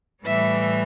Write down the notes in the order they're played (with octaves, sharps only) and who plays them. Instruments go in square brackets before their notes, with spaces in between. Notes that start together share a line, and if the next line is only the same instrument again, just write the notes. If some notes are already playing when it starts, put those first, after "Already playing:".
[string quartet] A2 E3 G3 E5